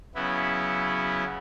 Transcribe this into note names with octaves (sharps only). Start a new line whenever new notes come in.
C#3 F#3 B3 E4